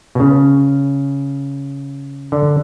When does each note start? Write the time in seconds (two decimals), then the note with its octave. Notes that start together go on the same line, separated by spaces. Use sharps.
0.15 B2
0.20 C#3
2.32 D3